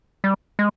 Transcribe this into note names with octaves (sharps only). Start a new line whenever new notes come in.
G3
G#3